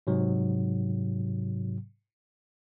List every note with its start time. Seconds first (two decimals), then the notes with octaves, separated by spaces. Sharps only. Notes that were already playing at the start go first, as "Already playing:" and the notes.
0.07 G#2 C3 F#3